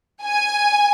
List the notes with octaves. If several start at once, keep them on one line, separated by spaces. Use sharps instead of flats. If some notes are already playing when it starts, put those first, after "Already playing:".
G#5